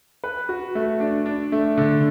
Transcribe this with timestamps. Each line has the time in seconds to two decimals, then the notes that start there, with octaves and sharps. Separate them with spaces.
0.24 B4
0.49 F#4
0.75 A3
1.00 D4
1.26 D4
1.52 A3
1.78 D3